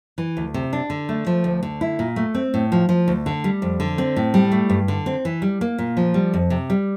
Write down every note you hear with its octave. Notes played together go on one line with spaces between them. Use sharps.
E3
D2
C3
D4
D3
A3
F3
D2
D3
E4
A#2
A3
C4
A2
F3
F3
D2
D3
G3
F2
D3
C4
A2
G3
A3
G2
D3
C4
E3
G3
A#3
A#2
F3
G3
F2
C3
G3